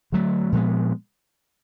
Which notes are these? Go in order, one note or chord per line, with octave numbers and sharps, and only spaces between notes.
D3 F#3 A3
A#2 F3 G#3 B3